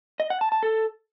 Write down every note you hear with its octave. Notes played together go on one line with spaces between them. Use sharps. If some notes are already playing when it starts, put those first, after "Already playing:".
D#5
F#5
A5
A5
A4